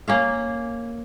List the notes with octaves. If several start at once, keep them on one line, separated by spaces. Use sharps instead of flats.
A#3 C#4 F5